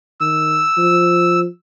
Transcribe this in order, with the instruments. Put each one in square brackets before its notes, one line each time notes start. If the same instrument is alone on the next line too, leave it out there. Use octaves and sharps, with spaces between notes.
[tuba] D#3 [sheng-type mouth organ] E6
[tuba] F3